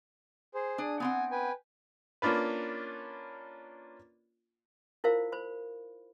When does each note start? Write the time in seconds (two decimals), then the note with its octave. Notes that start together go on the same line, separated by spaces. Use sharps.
0.54 G#4 C5
0.78 D4 G#4 D#6
1.00 B3 C4 F#5 G#5
1.31 B4 G5 G#5
2.22 A#3 C#4 D4 F4 B4
5.04 E4 F4 A#4 C5 F5
5.32 C5 B5